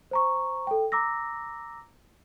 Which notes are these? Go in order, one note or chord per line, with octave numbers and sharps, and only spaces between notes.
C5 A#5 C#6
A4 G5
A#5 D6 E6 A#6